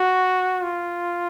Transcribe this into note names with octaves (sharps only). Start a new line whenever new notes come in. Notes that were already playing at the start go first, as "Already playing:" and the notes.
Already playing: F#4
F4